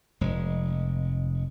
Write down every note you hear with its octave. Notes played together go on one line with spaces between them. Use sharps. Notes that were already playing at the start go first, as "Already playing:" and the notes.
F1 G#3